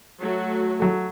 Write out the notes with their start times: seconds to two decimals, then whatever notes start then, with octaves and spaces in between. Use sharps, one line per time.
0.20 F#3 A3 F#4
0.80 F#3 A3